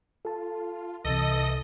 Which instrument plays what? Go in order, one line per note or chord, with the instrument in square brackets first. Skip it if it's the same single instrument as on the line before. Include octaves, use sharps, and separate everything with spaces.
[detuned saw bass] F4 [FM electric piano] A4 A5
[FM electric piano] C2 C3 [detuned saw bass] E3 [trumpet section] A4 [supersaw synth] D#5